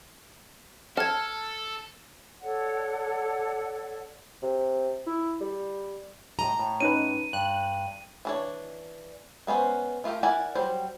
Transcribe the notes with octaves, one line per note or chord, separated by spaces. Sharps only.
A4 A5 F6 G#6
A4 C#5 D5 F#5
C3
E4
G3
A2 D#5 A#5
A2
C#4 D#4 B4 D#7
G2 F#6
E3 D4 C#5
G#3 B3 C#4 C5
A3 F4 G4 A#4
E4 A#4 D5 F#5 G#5
F#3 G3 C5